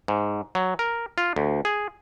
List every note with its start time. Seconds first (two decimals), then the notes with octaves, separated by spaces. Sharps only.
0.08 G#2
0.55 F#3
0.79 A#4
1.18 F4
1.36 D2
1.65 G#4